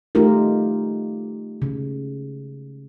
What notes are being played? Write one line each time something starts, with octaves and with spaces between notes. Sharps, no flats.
A3 D#4 F4 G4 A#4
C#3